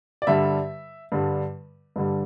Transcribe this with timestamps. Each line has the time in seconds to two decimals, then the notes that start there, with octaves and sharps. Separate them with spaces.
0.22 D5
0.27 G2 D3 G3 E5
1.12 G2 D3 G3
1.96 G2 D3 G3